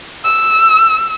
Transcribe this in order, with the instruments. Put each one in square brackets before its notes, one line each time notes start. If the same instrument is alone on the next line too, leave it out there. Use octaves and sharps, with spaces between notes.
[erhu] E6